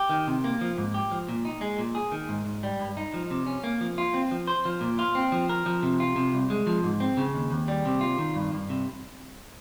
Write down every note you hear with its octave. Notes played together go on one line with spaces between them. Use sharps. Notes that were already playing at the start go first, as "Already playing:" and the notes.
Already playing: G4
D#3
C3
A#3
F3
G#2
G4
F3
A#2
D#4
G#3
A#2
G#4
D#3
G#2
G#2
G3
G2
D#4
F3
C3
C#4
A#3
F3
F4
C4
F3
C5
F3
A#2
F4
C4
F3
A#4
F3
C3
F4
C3
C2
G#3
F3
G#2
C4
C#3
D#2
D#2
G3
C3
F4
D#3
G2
G2
C3